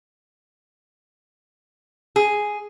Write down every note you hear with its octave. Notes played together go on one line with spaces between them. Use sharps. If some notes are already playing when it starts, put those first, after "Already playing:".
G#4